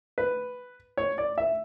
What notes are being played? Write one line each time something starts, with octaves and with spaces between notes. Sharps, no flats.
B4
C#5
D5
E5